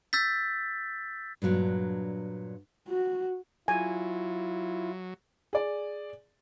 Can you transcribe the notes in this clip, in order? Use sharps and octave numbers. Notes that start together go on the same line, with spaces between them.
E6 G6 A6 B6
G2 A#2 F#3 D4
F#4
F#3 E4 F4 G#5
G#4 D5